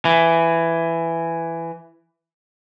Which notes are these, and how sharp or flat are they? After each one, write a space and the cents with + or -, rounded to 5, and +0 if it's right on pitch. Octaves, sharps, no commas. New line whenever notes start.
E3 +10